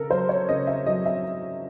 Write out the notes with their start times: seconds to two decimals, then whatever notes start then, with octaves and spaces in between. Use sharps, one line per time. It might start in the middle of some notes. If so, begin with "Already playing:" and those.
Already playing: C#3 A4 A#4
0.10 F#3 C5
0.29 C#5
0.49 C#3 D#5
0.67 E5
0.86 F#3 D#5
1.06 E5